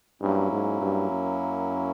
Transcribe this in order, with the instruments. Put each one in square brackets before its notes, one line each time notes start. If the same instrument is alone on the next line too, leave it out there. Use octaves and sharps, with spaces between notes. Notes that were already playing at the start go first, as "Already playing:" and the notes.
[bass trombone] G2 [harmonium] F#3 A#3 C#4 E4
[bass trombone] G#2
G2
F#2